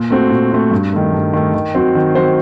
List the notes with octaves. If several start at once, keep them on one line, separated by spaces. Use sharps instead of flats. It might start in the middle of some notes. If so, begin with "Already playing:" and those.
Already playing: A#2
A3 C4 F#4
A#2
A3 C4 F#4
G2
D#3 A3
G2
D#3 A3
D#3
F#3 C4 F#4 C5
D#3
F#3 C4 F#4 C5